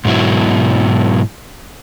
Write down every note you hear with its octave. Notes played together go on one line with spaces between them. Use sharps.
G#2 B2 F#3 E4